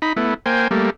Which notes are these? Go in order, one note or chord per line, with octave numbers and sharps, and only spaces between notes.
D#4 B5
A3 B3 E4
A#3 C5 G5 G#5
G3 A3 A#3